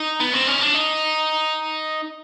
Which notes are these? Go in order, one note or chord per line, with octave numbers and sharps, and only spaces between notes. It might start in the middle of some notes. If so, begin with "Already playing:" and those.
Already playing: D#4
B3
C4
C#4
D4
D#4